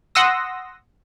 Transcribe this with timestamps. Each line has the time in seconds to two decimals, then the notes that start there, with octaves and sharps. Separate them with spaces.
0.15 F#5 C6 D#6 E6 A#6